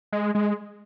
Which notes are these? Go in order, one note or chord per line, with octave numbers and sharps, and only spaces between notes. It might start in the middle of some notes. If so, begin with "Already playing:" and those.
G#3
G#3